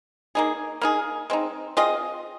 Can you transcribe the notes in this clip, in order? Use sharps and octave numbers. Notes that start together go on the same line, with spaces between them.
A#3 D#4 G#4
A#3 D#4 G#4
G#3 C4 D#4
C4 F4 G#4 D#5